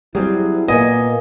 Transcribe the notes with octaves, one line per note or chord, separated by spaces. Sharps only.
F#3 G3 C4 E4 G#4
A#2 A#3 B3 D#5 G#5